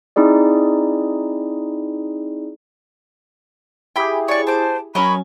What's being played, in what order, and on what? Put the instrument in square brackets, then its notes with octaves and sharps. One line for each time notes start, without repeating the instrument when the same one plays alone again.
[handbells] C4 D#4 E4 G#4 D5
[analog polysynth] E4 G4 G#4 [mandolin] G5 B5
[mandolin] C#5 C#6 [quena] D5
[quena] C5 [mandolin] A5 D6
[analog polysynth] F#3 C#4 [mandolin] A#4 C#5 D#5 [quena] B5